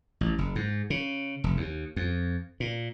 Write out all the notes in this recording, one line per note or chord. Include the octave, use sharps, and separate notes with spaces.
A1
F#1
G#2
C#3
F1
D#2
F2
A#2